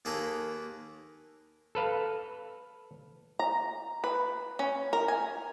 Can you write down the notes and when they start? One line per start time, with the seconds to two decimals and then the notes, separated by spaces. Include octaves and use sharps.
0.05 D#2 A#3 G#4 A4 B4 A#5
1.75 A4 B4 F5
3.39 A#5
4.04 B4
4.59 C#4
4.93 A#4
5.08 G#5